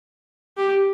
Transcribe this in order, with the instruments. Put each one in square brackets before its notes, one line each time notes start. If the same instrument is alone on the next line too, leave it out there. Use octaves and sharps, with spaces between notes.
[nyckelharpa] G4